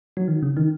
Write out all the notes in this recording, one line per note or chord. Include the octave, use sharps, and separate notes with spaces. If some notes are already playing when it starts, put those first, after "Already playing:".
F#3
D#3
C#3
D#3